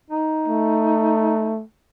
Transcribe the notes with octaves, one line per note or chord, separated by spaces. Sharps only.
D#4
A3